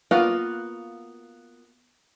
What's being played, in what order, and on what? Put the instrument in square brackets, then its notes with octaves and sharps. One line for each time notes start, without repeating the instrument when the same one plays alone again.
[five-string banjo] A#3 B3 F4 F#4 B4